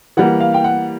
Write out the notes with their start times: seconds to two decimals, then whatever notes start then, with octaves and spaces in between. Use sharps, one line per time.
0.17 E3 G3 A#3 F#5
0.40 F5
0.54 G5
0.64 F#5